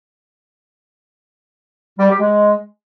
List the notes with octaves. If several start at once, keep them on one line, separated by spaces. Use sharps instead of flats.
G3
G4
G#3